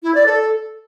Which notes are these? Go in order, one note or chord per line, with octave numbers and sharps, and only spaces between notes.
E4
D5
A4